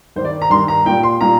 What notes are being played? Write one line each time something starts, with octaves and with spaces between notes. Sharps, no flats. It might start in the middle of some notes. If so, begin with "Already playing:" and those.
G2 D#3 G3 C5
D5
A#5
G2 D#3 G3 C6
A#5
A#2 G3 G5
C6
A#2 G3 A#5